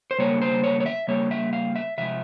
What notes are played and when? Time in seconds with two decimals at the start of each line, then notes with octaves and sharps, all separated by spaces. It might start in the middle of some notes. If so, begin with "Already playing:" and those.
0.11 C5
0.19 C#3 G3 A#3 C#5
0.42 C5
0.64 C#5
0.80 C#5
0.86 E5
1.08 C#3 G3 A#3 C#5
1.31 E5
1.53 F5
1.76 E5
1.98 C3 F3 G#3 E5